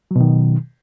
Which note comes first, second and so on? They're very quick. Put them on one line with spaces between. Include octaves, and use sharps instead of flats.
F#3 B2 D#3